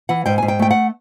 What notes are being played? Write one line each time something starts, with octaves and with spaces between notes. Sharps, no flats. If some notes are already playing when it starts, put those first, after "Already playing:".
E3 F#5
G#2 G5
G#2 G#5
G5
A3 G5
F#5